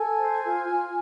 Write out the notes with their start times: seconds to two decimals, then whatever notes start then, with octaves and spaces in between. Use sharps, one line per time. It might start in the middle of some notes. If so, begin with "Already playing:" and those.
Already playing: A4 G#5
0.18 C5
0.43 F4
0.67 F4